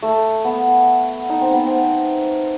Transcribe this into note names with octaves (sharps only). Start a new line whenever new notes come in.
A3
B3
D#4
C4
B3
C4